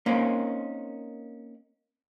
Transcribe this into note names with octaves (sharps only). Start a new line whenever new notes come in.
A#3 C4 C#4 D#4